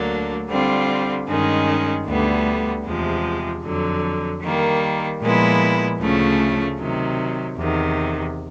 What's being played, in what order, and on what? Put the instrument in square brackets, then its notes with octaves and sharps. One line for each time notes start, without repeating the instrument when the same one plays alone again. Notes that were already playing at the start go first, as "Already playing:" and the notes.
Already playing: [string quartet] D2 D3 F#3 A#3 D4
D3 G3 C4 F4
G2 D#3 G#3 C#4
D2 D3 G3 B3
E2 C3 F3 G#3
F2 D3 F#3
D#3 G3 A#3
A#2 F3 G#3 B3 E4
D2 C#3 F3 A3 C#4
C3 D#3 F#3
E2 C3 D#3